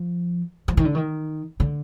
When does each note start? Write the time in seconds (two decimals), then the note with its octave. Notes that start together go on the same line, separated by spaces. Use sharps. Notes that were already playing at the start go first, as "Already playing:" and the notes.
Already playing: F3
0.68 F3
0.77 D#3
0.85 D3
0.95 D#3
1.60 D3